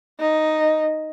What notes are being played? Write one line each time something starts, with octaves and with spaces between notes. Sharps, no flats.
D#4